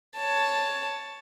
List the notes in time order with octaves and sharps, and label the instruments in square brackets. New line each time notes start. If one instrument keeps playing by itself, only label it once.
[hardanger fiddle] C#5 A5